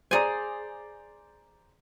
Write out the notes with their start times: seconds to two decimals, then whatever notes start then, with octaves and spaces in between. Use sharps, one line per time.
0.11 G#4 C5 D5 G#5 A#5